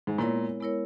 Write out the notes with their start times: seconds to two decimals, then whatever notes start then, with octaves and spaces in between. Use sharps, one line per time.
0.07 G#2
0.18 A#2 G#3 B3 E4 A#4 C#5
0.60 G#3 B3 E4 A#4 C#5